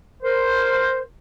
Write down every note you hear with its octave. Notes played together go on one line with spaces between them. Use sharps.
A#4 C5